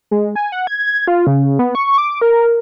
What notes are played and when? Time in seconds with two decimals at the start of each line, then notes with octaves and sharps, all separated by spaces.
0.11 G#3
0.36 G#5
0.52 F#5
0.67 G#6
1.07 F4
1.27 C#3
1.59 B3
1.75 C#6
1.98 D6
2.22 A#4